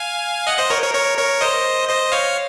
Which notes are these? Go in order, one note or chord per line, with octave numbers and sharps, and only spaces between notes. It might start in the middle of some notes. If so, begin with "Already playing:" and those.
Already playing: F5 G#5
D#5 F#5
C5 D#5
A#4 C#5
A#4 C#5
A#4 C#5
A#4 C#5
C5 D#5
C5 D#5
C#5 F5